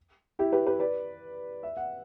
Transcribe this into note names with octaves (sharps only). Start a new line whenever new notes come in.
E4 G4
G4 B4
G4 B4
B4 D5
E5
F#5